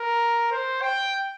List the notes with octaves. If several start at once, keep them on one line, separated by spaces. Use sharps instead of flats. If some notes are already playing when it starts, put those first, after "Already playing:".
Already playing: A#4
C5
G5